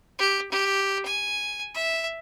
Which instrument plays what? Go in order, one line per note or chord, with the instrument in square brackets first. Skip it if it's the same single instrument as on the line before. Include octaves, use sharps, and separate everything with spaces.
[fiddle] G4
G4
G#5
E5